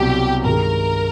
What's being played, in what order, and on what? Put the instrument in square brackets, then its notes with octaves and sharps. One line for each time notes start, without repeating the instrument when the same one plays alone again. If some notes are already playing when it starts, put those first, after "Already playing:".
Already playing: [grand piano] C2 B2 F#3 [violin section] G4
[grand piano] G2 D#3 G#3 [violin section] A#4